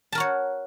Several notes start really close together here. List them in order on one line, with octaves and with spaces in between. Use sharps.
A5 A#4 F#4 C#5